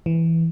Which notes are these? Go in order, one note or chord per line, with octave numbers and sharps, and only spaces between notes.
E3